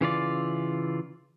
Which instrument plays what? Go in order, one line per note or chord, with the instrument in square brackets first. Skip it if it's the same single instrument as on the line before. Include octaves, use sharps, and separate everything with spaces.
[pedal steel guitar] C#3 E3 F4 D5